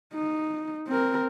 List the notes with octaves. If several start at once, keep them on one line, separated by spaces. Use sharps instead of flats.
D#4
C4 A#4